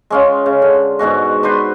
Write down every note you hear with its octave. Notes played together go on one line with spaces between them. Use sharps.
G#3 C#4 F4
C#3
D3
G#2 B2 G#3 F#4
D4 F#4 B4 C5